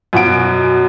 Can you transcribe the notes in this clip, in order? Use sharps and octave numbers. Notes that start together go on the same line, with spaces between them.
F#2 B2 F#4 D7